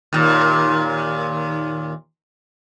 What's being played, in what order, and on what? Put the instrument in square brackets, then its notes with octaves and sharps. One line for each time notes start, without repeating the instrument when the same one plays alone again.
[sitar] D#2 A#2